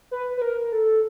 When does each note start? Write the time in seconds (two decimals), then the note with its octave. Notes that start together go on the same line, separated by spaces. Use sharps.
0.11 B4
0.37 B4
0.42 A#4
0.72 A4